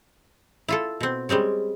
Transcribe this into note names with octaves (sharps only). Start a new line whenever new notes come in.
E4 F4 A4
B2 C4
G3 G#3 C4 C#4